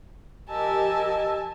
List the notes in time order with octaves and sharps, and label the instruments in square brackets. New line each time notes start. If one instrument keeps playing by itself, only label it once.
[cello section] F3 G4 A#4 [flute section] D#5 E6 [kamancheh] G#5 A5